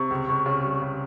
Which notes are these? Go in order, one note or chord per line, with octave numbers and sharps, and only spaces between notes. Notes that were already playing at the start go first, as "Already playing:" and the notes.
Already playing: C3 C#6
C#2
C#2
C#3
G3
C#3